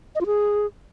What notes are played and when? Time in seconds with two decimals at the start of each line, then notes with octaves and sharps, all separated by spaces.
0.15 D#5
0.21 F4
0.26 G#4